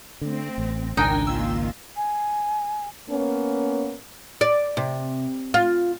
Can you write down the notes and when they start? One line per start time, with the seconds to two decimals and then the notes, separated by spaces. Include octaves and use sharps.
0.21 D3 A3 C4
0.58 A1
0.97 G#1 C#2 D4 D#4 A#4 G5 G#5
1.27 D#3 A#3 F4 E6
1.96 G#5
3.10 A#3 B3 C#4
4.41 D5
4.77 C3
5.54 F4